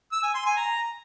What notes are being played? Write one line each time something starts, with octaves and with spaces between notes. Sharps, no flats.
E6
G#5
C6
G#5
A#5